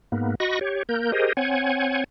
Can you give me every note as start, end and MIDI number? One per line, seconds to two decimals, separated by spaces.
0.12 0.35 44
0.12 0.35 58
0.12 0.35 59
0.40 0.59 66
0.40 0.59 75
0.40 0.59 83
0.40 0.59 85
0.40 0.59 94
0.61 0.83 67
0.61 0.83 73
0.89 1.12 58
0.89 1.12 70
0.89 1.12 91
1.12 1.33 67
1.12 1.33 68
1.12 1.33 70
1.12 1.33 72
1.12 1.33 75
1.37 2.04 60
1.37 2.04 73
1.37 2.04 78
1.37 2.04 80